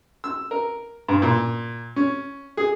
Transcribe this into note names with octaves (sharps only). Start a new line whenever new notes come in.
E6
A#4
G2
A#2
C#4
G#4